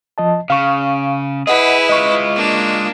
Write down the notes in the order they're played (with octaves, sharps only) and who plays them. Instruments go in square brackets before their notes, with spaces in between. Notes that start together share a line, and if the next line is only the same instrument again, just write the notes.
[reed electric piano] F3 D#5 A5
[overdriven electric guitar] C#3 [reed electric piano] F5 C#6
[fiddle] E4 B4 [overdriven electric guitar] G#4 [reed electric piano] D#5 F#5
[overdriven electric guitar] G#3 F4 [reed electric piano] D#5 C#6
[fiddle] A#3 D4